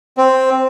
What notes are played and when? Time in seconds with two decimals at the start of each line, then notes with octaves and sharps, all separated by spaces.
0.17 C4